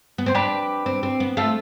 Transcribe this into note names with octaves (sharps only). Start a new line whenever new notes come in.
B3
C4 C5
D4 G4 B4
C4
C4
B3
A3 F4 A4